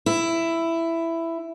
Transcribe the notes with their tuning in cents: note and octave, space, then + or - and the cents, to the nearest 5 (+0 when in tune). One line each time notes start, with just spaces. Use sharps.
E4 +10